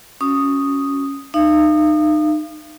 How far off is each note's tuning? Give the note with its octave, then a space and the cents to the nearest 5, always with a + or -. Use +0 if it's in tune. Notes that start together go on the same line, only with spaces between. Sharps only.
C#4 +0 F#4 -25 D#6 +0
D#4 -30 F5 -40